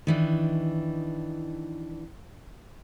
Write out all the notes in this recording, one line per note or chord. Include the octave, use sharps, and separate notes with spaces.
D#3 E3 D4